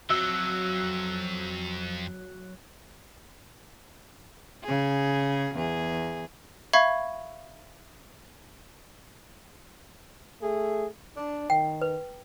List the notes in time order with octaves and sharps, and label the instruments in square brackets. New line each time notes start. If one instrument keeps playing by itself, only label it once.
[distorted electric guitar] F2 [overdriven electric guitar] F#3 [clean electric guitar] E5
[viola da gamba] C#3 G#4
E2 G#4
[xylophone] E5 F5 B5 C#6 G#6
[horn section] A3 G#4
D4
[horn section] D#3 [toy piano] G5
[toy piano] B4